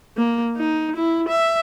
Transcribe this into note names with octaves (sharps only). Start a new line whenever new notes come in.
A#3
D#4
E4
E5